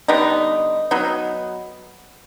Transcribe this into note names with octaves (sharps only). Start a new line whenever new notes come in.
D3 G3 B3 D#4
F#3 B3 D#4